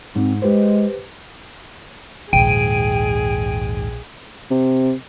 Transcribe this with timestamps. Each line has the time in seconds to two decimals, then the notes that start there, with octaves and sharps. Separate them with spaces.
0.15 G#2 C4
0.42 G#3 G4 B4 C5
2.33 A#1 D#2 G#2 G#4 G5 D7 D#7
4.51 C3